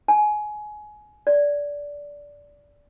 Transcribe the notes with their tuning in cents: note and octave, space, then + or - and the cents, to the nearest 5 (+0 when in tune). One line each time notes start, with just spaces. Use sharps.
G#5 +20
D5 -15